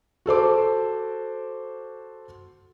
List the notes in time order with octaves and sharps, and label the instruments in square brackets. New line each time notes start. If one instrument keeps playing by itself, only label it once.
[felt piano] F#4 A4 C5 D6